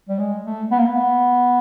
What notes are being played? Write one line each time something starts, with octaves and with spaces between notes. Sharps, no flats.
G3
G#3
A3
B3
A#3
B3